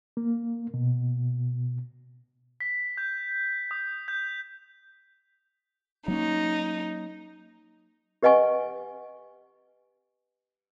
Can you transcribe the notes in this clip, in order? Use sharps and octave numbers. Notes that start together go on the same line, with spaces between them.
A#3
B2
B6
G6
D#6
G6
F#3 A#3 C#4 D#4
G4 B4 D#5 F#5 G#5 C#6